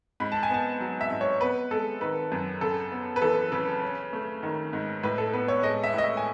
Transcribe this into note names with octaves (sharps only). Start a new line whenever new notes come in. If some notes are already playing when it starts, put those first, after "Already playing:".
G#2 B5
A5
G#5
B3 A5
F#3
E5
G#2
C#5
B3 B4
G#3 A4
D#3 B4
F#2
C#3 A4
B3
B4
E3 A4
C#3 B4
C#4
A3
D#3
G#2
A2 B4
A4
B3 B4
C#5
G#3 D#5
E5
A2 D#5
E5
G#5